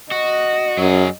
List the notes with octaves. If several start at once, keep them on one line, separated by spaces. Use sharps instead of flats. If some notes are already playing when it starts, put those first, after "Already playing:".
F#4 D#5
F#2 F#3 G#4